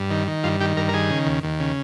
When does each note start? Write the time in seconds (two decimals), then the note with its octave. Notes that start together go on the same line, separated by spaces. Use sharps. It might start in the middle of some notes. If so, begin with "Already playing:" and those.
Already playing: G2
0.10 D#3
0.27 D#3
0.44 G2 F4
0.60 D#3 G4
0.77 G2 A#4
0.89 A#4
0.94 D#3 G#4
1.10 C#3
1.27 D#2
1.43 D#2
1.60 C#3